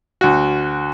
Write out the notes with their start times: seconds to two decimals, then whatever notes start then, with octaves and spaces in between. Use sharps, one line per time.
0.21 D2 F#4